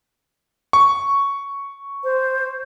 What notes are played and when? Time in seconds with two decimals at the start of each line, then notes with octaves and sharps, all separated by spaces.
0.73 C#6
2.04 C5